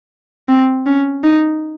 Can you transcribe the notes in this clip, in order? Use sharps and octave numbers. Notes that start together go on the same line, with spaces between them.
C4
C#4
D#4